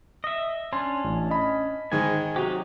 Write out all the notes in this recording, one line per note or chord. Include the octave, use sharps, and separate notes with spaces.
D#5 E5
C#4 D4 C6
A1
D#5 B5
G#2 D#3 G#3 G#5
C3 F#3 D#4 F#4 G4